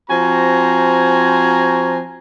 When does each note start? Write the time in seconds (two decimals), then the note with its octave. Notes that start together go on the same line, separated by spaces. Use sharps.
0.10 F3 C4 F#4 G#5 A#5